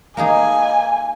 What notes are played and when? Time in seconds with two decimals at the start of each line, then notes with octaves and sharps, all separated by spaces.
0.17 A#3 D#4 G#4 G#5